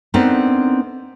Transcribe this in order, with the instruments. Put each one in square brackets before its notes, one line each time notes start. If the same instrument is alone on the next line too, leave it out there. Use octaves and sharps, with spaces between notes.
[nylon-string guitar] B3 C4 D4 D#4 A4 A#4